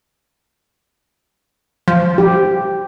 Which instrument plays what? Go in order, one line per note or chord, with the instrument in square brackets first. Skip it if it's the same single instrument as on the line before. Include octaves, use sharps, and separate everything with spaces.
[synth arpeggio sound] F3
[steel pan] G4